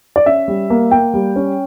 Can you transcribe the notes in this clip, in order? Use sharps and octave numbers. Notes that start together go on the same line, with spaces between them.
D5
C#4 E5
G3
A#3
A#3 G5
G3
C#4